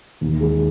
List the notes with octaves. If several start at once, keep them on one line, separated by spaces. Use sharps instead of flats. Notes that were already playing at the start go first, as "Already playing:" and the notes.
D#2
G#3